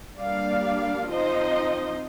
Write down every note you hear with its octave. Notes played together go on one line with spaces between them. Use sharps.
G3 A#3 D4 D5 F5
F3 C4 D#4 C5 D#5